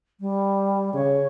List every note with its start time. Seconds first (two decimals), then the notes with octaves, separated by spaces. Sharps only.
0.20 G3
0.94 C#3 C#5